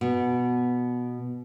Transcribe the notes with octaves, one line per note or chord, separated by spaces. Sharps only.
B2